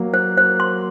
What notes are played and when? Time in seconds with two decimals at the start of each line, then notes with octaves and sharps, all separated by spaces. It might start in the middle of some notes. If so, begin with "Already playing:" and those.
Already playing: F#3 A#3
0.14 C5
0.38 C5
0.60 C6